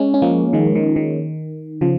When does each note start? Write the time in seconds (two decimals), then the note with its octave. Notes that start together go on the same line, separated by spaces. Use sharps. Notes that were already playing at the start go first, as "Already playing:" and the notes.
Already playing: G#3 C#4
0.14 C#4
0.22 F3 A#3
0.53 D#3 G#3
0.75 D#3
0.96 D#3
1.81 C#3 F3